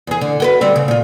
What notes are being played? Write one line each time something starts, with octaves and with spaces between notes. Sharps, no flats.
E2 G#4
D3
F#4 A#4 B4
D3 G3 C4
C#3
A#2 F4